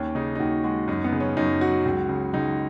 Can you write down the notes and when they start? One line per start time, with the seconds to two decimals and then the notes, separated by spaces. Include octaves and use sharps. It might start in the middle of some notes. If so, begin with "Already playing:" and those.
Already playing: D#2 C#4
0.15 C#3 D#4
0.35 D#4
0.39 D#2 F#4
0.64 G#3 F#4
0.88 F#2 D#4
1.04 B3
1.12 C#3
1.20 C#4
1.37 F#2 D#4
1.61 F#3 F#4
1.85 C#2
2.09 C#3
2.34 C#2 D#4